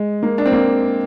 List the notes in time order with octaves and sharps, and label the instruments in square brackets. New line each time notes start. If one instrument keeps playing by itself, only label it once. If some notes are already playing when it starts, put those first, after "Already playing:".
Already playing: [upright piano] G#3
A#3
D4
C4
A#3